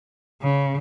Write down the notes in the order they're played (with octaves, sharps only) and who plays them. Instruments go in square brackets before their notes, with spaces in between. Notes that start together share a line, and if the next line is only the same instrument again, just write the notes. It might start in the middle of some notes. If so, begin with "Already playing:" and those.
[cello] C#3